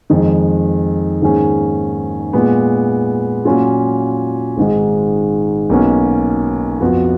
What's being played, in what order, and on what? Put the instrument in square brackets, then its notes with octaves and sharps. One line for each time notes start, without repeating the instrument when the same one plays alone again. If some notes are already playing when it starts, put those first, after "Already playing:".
[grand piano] F2 D#3 G#3
G#2 D#3 A#3 C#4 G#4
A#2 G#3 B3
A#2 F#3 C#4 F4
G#1 G#2 D#3 G#3
B1 B2 A#3 C#4
F2 F3 B3 F#4